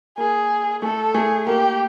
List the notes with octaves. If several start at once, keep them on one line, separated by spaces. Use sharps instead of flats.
A#3 G#4
A3 A4
A3 G#4
A#3 G4